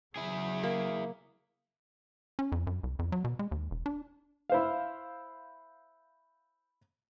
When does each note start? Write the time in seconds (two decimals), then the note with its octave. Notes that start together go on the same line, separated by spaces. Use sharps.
0.16 C#3 F#3 E4 G#4
0.63 A#3
2.39 C#4
2.52 F2
2.67 F#2
2.83 C2
2.99 F2
3.12 F#3
3.24 B2
3.39 G#3
3.51 D#2
3.71 E1
3.86 D4
4.50 E4 C5 F5